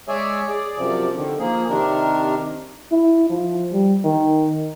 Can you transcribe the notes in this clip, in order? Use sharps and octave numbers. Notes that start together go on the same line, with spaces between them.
G#3 G#4 C#5 D5 E5 G#5
G#4 D5
F#2 C3 F3 D5
D3 D#3
F3 A#3 G#4
C3 D#3 D4 A#4
E4
F3
G3
D#3